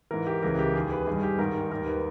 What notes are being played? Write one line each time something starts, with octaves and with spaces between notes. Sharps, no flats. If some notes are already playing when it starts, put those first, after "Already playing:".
G#2 E3 A#4
G4
C#2 C#3 E3 A#4
G4
D#2 D#3 G#4
B4
G2 D#3 G#4
G4
G#2 D#3 A#4
D#2 D#3 A#4
B4